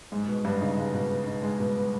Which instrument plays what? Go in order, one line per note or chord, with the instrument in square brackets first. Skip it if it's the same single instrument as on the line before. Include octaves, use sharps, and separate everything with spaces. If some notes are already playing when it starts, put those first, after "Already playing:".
[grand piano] G#2 [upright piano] G#3
[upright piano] B2
[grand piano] G2 [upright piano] B3
[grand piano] C#3 [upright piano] D#4
[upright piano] G#3
B2
B3
D#4
G#3
B2
B3